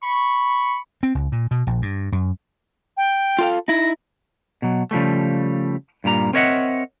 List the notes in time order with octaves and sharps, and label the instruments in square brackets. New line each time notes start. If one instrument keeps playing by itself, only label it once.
[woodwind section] B5 C#6
[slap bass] C4
C#2
A#2
B2
A#1
G2
F#2
[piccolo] G5
[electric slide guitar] F4 A4 F5
[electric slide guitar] D#4 E4 [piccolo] A#6
[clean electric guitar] B2 F#3
C#3 F3 G3 A3
G2 A#2 G3 A#5
C4 A#4 C#5 D#5 E5 F#5